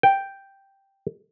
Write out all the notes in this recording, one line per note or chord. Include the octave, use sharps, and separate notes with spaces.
G5